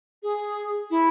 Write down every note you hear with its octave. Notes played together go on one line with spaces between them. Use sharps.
G#4
E4